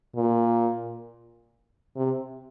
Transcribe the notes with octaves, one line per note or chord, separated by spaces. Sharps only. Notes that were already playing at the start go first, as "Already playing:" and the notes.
A#2
C3